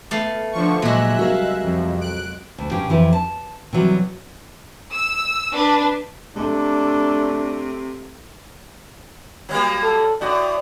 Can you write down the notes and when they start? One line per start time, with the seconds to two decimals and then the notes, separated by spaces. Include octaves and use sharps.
0.11 A3 B3 F5
0.52 D3 F3 C#6
0.82 A#2 F#3 G#3 E5 F#6
1.19 C2 F#4 A#4 F5
1.63 F2
2.00 F#6 D7
2.58 D2
2.71 G2 C#3 G4
2.90 F2 E3 E4 G4 B4
3.13 A5
3.73 C3 E3 F#3 G3
4.92 E6
5.52 D4 B4
6.36 C3 A3 D4
9.49 F#3 G3 A#3
9.82 A4
10.21 A2 F#4 D5